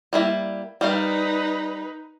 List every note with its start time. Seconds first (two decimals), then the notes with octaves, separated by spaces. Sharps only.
0.13 G3 A#3 E4
0.81 G3 D#4 A#4 B4 F5